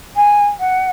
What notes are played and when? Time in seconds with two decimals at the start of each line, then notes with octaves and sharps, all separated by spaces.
0.16 G#5
0.60 F#5